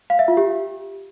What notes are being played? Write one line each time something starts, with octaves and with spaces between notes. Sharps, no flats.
F5
E5
F4
G4